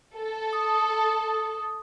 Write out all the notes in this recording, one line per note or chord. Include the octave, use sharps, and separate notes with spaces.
A4
D#6